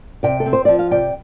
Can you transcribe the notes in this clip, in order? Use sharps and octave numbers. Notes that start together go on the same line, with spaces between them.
C3 D5 G5
A4
C4
C5
F3 D5
F5
C3 D5 G5